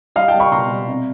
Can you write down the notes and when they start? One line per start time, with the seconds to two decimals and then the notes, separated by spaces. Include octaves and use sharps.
0.16 G3 D#5 F5
0.28 G5 A5
0.34 G3
0.40 B5 C#6
0.52 B2 A#5 C6
0.70 G3
0.88 C3